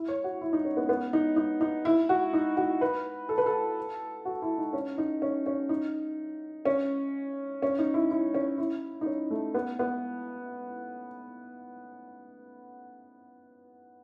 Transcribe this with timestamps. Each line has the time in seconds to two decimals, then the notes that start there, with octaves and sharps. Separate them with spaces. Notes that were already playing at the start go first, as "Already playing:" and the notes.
Already playing: E4
0.08 C#5
0.24 F#4
0.41 E4
0.53 D#4
0.65 C#4
0.77 B3
0.89 B3
1.13 D#4
1.36 D#4
1.61 D#4
1.85 E4
2.09 F#4
2.33 D#4
2.57 F#4
2.81 B4
3.29 A4
3.38 B4
3.46 A4
4.25 F#4
4.42 E4
4.58 D#4
4.73 C#4
4.98 D#4
5.22 C#4
5.46 C#4
5.69 D#4
6.65 C#4
7.62 C#4
7.79 D#4
7.94 E4
8.10 E4
8.34 C#4
8.58 E4
9.01 D#4
9.06 C#4
9.31 A3
9.54 B3
9.79 B3